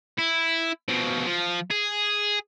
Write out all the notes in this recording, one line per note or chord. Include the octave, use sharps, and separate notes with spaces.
E4
B2 F3
F3
G#4